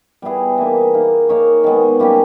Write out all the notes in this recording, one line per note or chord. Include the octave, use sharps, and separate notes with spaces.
G3 B3 E4 G#4
E3 A#3 D#4
A#3 D#4 G#4
A#3 D#4 A#4 C#5
D#3 G#3 B3
G3 A#3 C#4 G4